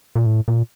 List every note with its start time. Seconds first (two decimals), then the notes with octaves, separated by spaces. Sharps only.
0.16 A#2
0.26 A2
0.48 A#2